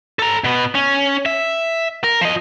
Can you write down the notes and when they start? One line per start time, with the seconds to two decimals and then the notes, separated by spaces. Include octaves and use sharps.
0.19 A4 A#5
0.44 B2 B3
0.75 C#4
1.26 E5
2.04 A#4
2.21 F3 D#5